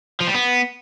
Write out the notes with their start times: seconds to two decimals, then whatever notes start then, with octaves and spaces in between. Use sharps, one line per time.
0.21 F3
0.28 G3
0.35 B3